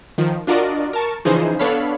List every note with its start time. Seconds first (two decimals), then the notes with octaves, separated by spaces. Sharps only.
0.18 D#3 F3
0.47 D4 F4 F#4 A#4 D5 D#5
0.93 A#4 A5 C#6
1.25 C#3 E3 F3 D#4 G#4 C5
1.59 B3 D4 A4 C#5 F5 B5